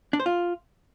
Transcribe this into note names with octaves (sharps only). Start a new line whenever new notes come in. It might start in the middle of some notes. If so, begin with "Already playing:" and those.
D4
C5
F4